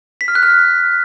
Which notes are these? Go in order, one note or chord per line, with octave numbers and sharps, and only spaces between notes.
B6
F6
F#6
F6